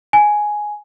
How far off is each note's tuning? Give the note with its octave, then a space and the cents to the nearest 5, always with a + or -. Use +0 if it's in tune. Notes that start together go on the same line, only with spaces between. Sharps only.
G#5 +5